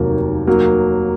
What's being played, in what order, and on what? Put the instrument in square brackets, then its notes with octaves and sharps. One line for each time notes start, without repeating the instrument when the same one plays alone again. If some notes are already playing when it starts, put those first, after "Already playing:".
Already playing: [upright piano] F1 D#2 D#3 [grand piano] F#3 A#3
[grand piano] F#3 A#3